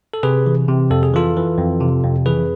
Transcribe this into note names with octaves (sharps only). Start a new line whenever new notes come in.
A4
C3 G#4 B4
E3
C3
F2 A4
G#4
E3 F4 A4
E3
F2
C3
F2
E3 G#4 B4